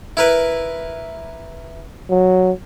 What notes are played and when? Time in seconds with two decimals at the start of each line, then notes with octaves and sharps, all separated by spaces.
0.17 E4 A#4 B4
2.10 F#3